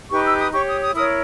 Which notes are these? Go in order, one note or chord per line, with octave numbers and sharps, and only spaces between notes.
D#4 G4 B4 C#6
E6
D#6
G4 C#5 C#6
D#6
D#6
E4 A#4 C#5 D#6